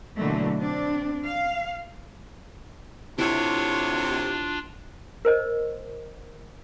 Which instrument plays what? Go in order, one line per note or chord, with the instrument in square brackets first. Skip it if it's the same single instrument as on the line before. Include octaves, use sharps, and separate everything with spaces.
[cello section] B2 D3 E3 F#3 A3 A#3
C4 D4
F5
[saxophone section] D2 C3 [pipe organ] D4 F4 [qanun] E4 [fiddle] C#5
[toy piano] A#4 C5 D#5